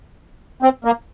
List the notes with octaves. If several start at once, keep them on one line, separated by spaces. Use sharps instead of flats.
C4
A#3